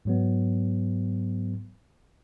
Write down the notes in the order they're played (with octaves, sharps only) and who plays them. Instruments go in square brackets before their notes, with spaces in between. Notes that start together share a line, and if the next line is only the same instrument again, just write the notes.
[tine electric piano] G#2 F#3 B3